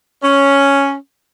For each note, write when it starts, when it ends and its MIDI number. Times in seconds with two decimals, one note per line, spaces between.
0.23 0.94 61